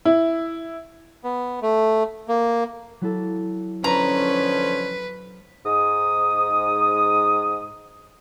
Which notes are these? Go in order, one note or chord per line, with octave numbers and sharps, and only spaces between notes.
E4
B3
A3
A#3
F#3 E4 A4
D3 F3 C#4 B4 A#5
G#2 D#6